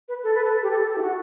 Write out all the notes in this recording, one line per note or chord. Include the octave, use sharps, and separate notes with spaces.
B4
A4
B4
A4
G4
A4
A4
G4
E4
F#4